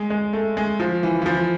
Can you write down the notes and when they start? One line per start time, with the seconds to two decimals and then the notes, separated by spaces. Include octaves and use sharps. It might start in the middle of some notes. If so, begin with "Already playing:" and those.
Already playing: G#3
0.10 G#3
0.33 A3
0.57 G#3
0.80 F3
1.03 E3
1.22 E3
1.26 F3